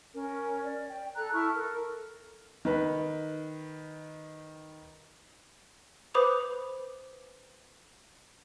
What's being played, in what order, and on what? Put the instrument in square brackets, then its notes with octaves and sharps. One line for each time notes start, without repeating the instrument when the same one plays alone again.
[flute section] C#4 A#4
D5
G5
A4 A#5 F#6
E4 A5 C#6 F6
A4 A#4
[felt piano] D#3 B4
[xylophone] B4 C5 B5 D6 D#6 F7